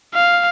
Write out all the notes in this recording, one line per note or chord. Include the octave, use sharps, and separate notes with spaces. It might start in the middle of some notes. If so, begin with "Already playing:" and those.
F5